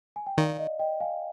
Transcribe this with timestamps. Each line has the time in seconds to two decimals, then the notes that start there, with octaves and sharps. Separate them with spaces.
0.16 G#5
0.26 G5
0.38 D#3 D5 F5
0.59 D#5
0.79 D#5 G5
1.00 F5 G#5